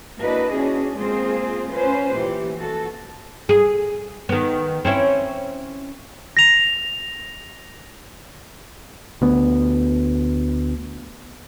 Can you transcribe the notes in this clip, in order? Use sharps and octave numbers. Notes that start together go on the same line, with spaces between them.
A#3 D4 E4 F#4 B4 D#5
C#4 D4 F#4 G#4
G#3 A#3 C4 F4 G#4 C5
C#4 F4 B4 C5
A#2 E3 G4
F#4 A4
G#4
D#3 B3
C4 C#4 E4
A#6 F7
D2 B3